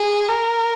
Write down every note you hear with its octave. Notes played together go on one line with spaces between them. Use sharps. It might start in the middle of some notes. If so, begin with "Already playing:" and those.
Already playing: G#4
A#4